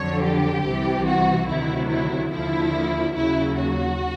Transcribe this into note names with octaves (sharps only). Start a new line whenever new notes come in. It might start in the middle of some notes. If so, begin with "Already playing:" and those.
Already playing: F2 D3 F#3 C#5
G4
C2 C3 E3
F#4
D2 C3 D#3 F#3 E4
E4
D#2 D3 F3 E4
D#2 C#3 F#3 E4
F#4